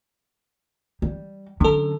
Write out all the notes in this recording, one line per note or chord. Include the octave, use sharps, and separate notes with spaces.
G3
D3 F#3 C#4 A4